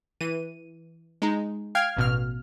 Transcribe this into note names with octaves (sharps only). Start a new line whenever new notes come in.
E3 D#7
G#3 D#4
F5 G5 F6 G#6
A1 B2 F6